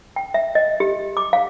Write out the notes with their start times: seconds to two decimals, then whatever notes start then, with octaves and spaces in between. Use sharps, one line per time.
0.16 G5
0.34 E5
0.55 D#5
0.80 G4
1.17 D6
1.33 F5